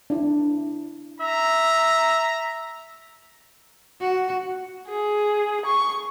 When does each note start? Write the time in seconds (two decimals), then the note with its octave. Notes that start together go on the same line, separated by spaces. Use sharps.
0.10 D4 E4
1.20 E5 A#5
4.01 F#4
4.90 G#4
5.66 C#6